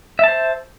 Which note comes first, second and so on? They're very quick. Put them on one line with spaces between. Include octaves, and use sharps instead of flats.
E5 A5 C5